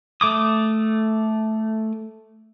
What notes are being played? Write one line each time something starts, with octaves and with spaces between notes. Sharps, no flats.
A3 D6 D#6